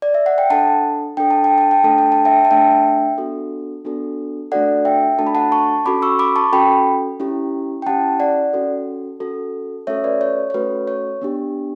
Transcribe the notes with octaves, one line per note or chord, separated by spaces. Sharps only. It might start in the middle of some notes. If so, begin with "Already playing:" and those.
D5
E5
F#5
G5
D4 A4 F#5 A5
D4 A4 G5
A5
G5
A5
G5
A3 D4 A4 A5
G5
A5
E5 G5
A5
A3 D4 A4 E5 G5
B3 D4 F#4 A4
B3 D4 F#4 A4
A3 D4 F#4 A4 D5 F#5
E5 G5
A3 D4 F#4 A4 A5
B5
F#5 A5
A5 C#6
C#4 F#4 A4 B5 D6
C#6 E6
B5 D6
A5 C#6
C#4 F#4 A4 G5 B5
C#4 E4 G4
G5
C#4 E4 G4 F#5 A5
D5 F#5
C#4 F#4 A4
C#4 F#4 A4
A3 C#4 F#4 A4 C#5 E5
B4 D5
C#5
C#5
A3 C#4 F#4 A4 B4
C#5
B3 D4 G4